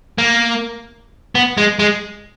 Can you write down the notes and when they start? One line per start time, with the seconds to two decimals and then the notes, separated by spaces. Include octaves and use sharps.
0.18 A#3
1.35 B3
1.58 G#3
1.79 G#3